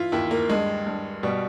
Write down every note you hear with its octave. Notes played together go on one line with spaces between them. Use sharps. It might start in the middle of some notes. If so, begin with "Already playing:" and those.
Already playing: E3 E4 F4
D#2 E4
A#3
G2 G#3
G2
B2 G3